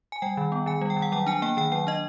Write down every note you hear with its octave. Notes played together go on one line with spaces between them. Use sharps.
G#5
G3 G5
D#3
B3
D#3 G#5
G3
G5
D#3
F#5
F#3 G5
D4 G#5
A#3 G5
D#3 G5
F#3 G5
D4 D#5